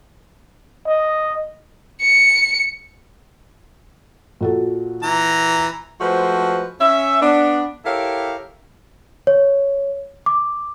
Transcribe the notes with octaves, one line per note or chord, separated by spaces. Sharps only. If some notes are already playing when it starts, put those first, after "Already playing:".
D#5
C#7
A#2 F#4 A4
E3 A#5
F3 G#3 A3 F#4 B4 C5
C#4 E5
B3 D4
E4 G4 A4 A#4 C#5 F5
C#5
D6